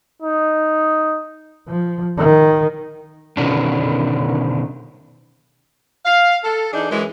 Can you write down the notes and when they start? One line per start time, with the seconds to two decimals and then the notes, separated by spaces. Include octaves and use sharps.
0.22 D#4
1.68 F3
2.18 D#3
3.37 B2 D3 D#3 C#4 D4
6.06 F5
6.44 A4
6.73 E3 D4 D#4 G#4
6.90 F#2 E3 G#3